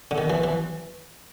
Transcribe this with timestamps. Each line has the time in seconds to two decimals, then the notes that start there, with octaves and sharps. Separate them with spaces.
0.11 D3
0.18 D#3
0.30 E3
0.44 E3